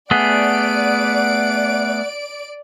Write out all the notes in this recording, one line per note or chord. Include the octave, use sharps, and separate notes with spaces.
A3 B3 G#4 D5 F#5 D7